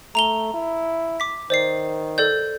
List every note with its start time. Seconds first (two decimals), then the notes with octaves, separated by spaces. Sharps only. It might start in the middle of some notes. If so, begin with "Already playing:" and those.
0.15 A3 A#5 F7 G7
0.54 E4
1.20 D6 B6
1.50 D#3 C5 D5 C7
2.18 A4 D5 G6